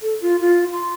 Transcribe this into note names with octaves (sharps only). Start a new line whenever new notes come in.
A4
F4
F4
C6